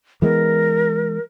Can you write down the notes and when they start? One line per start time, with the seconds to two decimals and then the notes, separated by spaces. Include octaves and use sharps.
0.22 E3 G#3 B3 A#4